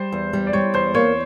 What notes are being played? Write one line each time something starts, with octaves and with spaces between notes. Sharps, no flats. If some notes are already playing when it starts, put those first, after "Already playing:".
Already playing: G3 C5
E2
G3
D5
G3 C#5
E2 C5
A#3 C#5